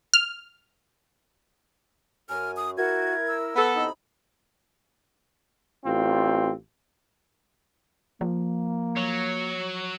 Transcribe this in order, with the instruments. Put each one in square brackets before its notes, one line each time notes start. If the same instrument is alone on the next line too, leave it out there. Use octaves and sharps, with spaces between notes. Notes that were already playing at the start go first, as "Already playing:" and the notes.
[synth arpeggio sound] F6
[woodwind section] F#2 [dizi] G#5 [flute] F6
[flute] D#6
[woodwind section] E4 A#4 [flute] F#4 [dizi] G#6
[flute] E6
[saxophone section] B3 A4 [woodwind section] B4 [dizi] B5
[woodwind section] A2 C3 D#4
[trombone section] A1 C4 F4
[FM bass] F3 [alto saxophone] A#3
[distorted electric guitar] F#3 [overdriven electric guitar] C#5